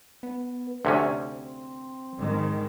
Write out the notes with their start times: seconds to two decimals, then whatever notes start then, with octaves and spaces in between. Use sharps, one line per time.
0.23 B3
0.85 D2 C3 C4 C#4
2.19 G#2 D#3 G#3